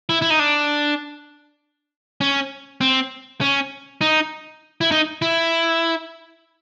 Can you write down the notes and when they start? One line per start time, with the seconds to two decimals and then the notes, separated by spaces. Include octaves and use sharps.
0.09 E4
0.22 E4
0.30 D#4
0.39 D4
2.21 C#4
2.81 C4
3.41 C#4
4.01 D#4
4.81 E4
4.91 D#4
5.22 E4